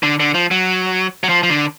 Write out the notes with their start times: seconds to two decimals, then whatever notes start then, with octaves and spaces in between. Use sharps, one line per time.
0.03 D3
0.20 D3
0.34 F3
0.51 F#3
1.24 F#3
1.29 F3
1.43 F3
1.50 D3